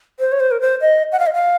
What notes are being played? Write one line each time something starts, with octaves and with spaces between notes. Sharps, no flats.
C5
C#5
C5
A#4
C5
D#5
F#5
F5
D#5
F5